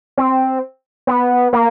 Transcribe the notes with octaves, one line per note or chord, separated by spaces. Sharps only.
C4
B3
A#3